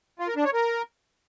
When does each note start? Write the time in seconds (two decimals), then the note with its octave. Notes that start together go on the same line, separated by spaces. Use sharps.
0.19 F4
0.28 A#4
0.36 D4
0.45 C#5
0.53 A#4